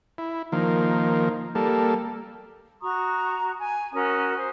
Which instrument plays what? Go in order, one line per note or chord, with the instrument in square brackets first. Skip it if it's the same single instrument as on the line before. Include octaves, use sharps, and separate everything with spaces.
[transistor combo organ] E4
D#3 F3 A#3
G3 A#3 A4
[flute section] F#4 A#5 C#6 D#6
G#5
C#4 F#4 A#4 D#6
C5 G#5